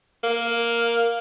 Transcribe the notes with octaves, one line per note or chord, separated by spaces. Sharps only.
A#3